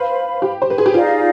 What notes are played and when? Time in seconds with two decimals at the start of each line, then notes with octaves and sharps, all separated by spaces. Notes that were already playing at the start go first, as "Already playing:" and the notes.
Already playing: B4 C5 F5 B5
0.42 G4
0.62 C5
0.70 B4
0.78 G#4
0.86 G4
0.94 D#4 F4 G#4 D5 F5